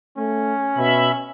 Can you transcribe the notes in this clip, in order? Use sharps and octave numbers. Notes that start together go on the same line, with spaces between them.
A3 C#4
B2 E5 B5